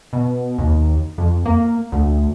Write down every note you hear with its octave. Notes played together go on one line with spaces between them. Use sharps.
B2
D#2
F2
A#3
D2